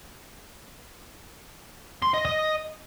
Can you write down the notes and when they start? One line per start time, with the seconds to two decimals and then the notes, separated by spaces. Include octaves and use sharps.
2.02 C6
2.14 D#5
2.25 D#5